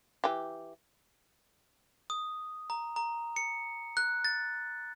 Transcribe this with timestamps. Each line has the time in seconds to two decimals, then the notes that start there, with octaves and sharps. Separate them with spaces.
0.24 E3 G4
2.10 D#6
2.70 A#5
2.96 A#5
3.36 C#7
3.97 F#6
4.25 A6